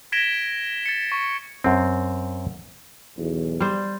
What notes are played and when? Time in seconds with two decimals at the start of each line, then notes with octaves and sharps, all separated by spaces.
0.12 G#6 A#6 B6 D7 E7 G7
0.86 A6 C#7
1.12 C#6
1.64 F#2 C4
3.17 B1 E2
3.60 G3 C5